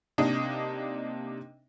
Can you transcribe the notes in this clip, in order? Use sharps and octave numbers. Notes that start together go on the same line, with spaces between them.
C3 A#3 D4 D#4 D#5